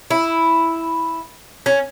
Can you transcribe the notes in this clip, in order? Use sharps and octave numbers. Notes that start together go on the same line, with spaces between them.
E4
C#4